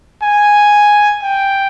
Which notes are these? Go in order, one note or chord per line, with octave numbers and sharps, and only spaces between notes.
G#5
G5